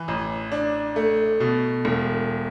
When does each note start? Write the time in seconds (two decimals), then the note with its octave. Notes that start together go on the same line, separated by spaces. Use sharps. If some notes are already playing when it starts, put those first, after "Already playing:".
Already playing: E3
0.08 A1
0.52 D4
0.96 A3
1.40 B2
1.85 E1